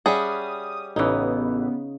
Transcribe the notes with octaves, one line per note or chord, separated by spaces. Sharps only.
G3 C#4 G#4 E5 F#5 D#6
A1 C#3 E3 B3 D#4